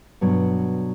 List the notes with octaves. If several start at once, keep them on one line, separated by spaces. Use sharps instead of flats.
G2 B2 F#3